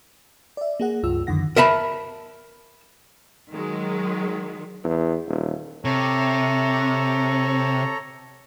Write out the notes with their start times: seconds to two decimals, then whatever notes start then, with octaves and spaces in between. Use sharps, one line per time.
0.57 D5 E5
0.80 A#3 G#4 F#5
1.03 C#2 G2 F4 E6
1.27 F#2 D3 D#3 F#5 A#6
1.56 A#4 E5 A5 B5
3.51 D#3 F#3 G#3
4.84 E2
5.28 D#1
5.85 C3 A4 C#5 A#5